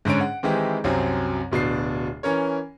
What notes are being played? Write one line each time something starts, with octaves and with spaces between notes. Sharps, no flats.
G#2 D3 C#4 C#5 D7
F#5
D#3 E3 G#3 C4 E4 G4
C2 F#2 F#3 C4
D1 B2 D4 C7
E3 C#4 A#4 C#5